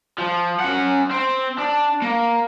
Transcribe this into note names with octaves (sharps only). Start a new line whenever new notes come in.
F3
C#4 F#5
C4
D4
A#3